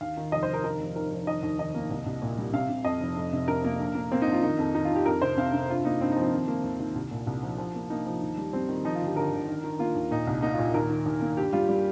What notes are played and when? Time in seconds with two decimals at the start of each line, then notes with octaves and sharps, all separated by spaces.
0.01 D#2 F5
0.17 D#3
0.32 F1 D#5
0.43 C5
0.48 F1
0.53 A#4
0.64 D#3 A#4
0.79 F1
0.96 D#3 A#4
1.12 F1
1.27 D#3 D#5
1.43 D#2
1.59 D#3 D#5
1.75 A#3
1.90 C2
2.06 C2
2.22 A#2
2.38 G3
2.53 C3 F5
2.69 C3
2.85 F2 D#5
3.00 F1
3.16 F2
3.33 C3
3.48 C3 A#4
3.64 A#3
3.80 A#1
3.95 A#3
4.11 A#3 C4
4.22 D#4
4.27 A#1
4.32 F4
4.43 D#3 D#4
4.59 F2
4.75 D#3 D#4
4.85 F4
4.90 D#3
4.96 G4
5.06 F2 A#4
5.22 C3 C5
5.37 C3 F5
5.54 C3
5.70 G2 F4
5.85 A#3 D#4
6.01 G2 C4
6.11 D#4
6.16 F3
6.22 C4
6.32 D#3
6.48 A#3
6.64 D#2
6.80 D#2
6.95 C2
7.11 A#2
7.27 C2
7.43 F3
7.58 F3
7.74 A#3
7.90 A#3 D#4
8.06 F3
8.22 D#2
8.38 G3
8.53 G3 C4
8.69 D#3
8.85 F3 D#4
8.95 F4
9.01 G1
9.06 G4
9.16 G1 A#4
9.32 G1
9.48 D#3
9.64 D#3
9.79 A#3 F4
9.95 D#2
10.11 A#2 D#4
10.27 C2
10.42 A#3 D#4
10.53 F4
10.59 A#2
10.74 D#2 A#4
10.90 D#3
11.06 D#2
11.21 A#3
11.37 G2 G4
11.53 G3 F4
11.69 G3